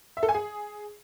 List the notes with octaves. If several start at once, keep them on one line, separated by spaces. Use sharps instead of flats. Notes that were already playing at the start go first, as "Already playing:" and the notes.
E5
A4
G#5
G#4